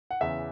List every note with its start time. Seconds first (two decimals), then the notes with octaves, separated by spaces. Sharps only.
0.11 F#5
0.21 E2 C#3 E3 E5